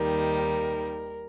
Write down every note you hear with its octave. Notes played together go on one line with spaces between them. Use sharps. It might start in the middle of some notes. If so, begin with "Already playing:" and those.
Already playing: D#2 D#3 G3 A#4